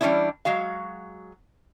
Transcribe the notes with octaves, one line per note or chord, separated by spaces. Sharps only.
E3 G3 A3 C#4 D4 E4
F#3 G#3 F#4 F5